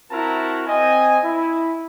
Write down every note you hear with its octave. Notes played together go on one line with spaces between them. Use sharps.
C4 E4 F#4 A#4 A5 A#5
C4 D#5 G#5
E4